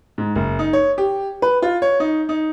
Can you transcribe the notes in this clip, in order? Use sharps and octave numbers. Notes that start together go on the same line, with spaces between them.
G#2
F#1
D#4
C#5
G4
B4
F4
C#5
D#4
D#4